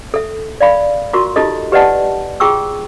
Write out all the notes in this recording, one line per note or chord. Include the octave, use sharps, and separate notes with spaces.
A4 E5
D5 F5 B5
F4 F#4 A#4 C6 C#6
D#4 F4 G4 A4 D#5
G4 B4 D5 D#5 F#5 A5
F4 G#4 G5 C#6 E6